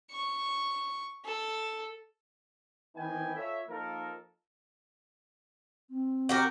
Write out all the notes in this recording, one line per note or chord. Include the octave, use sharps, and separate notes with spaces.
C#6
A4
D#3 E3 B3 C4 G5 G#5
F4 A4 C#5 E5
F3 A#3 D#4 A4 A#4
C4
F#4 G4 A#4